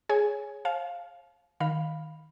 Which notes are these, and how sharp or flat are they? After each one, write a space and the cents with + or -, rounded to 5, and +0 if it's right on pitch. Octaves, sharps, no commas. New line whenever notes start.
G#4 +5 C#5 +0 G#5 +0
C5 +45 F5 +0 A5 -40
D#3 +5 F5 +0 B5 +0